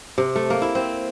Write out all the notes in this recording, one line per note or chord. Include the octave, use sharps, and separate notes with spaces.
C3
A3
A#3
E4
C4